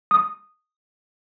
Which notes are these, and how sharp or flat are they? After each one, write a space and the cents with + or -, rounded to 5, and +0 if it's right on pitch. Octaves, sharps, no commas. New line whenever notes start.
D#6 -5